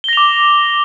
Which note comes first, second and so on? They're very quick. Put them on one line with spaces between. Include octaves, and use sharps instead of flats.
G7 A#6 F7 D6